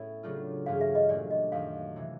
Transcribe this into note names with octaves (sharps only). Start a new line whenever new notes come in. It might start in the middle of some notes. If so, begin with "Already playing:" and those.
Already playing: A2 B3 C#4 E4
C#3 F#3 A3 D4 F4
G2 E3 G#3 C#4 F4 F5
E5
D#5
A#2 F#3 A3 D4 D5
D#5
F#2 D#3 F#3 F5
C3 E3